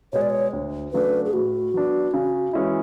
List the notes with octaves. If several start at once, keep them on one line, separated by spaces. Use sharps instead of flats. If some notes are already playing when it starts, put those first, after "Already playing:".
B2 G#3 C#5
D5
C#5
D2
C#3 F#3 A3 D4 B4
G#4
A2 F#4
F#3 B3 D4
C#3
E3 G#3 C#4 E4